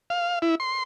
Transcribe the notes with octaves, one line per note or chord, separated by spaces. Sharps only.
F5
E4
C6